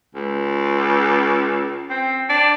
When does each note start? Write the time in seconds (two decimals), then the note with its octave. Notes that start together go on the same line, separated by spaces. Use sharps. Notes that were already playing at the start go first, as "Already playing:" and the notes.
0.15 C#2
1.90 C4
2.29 D4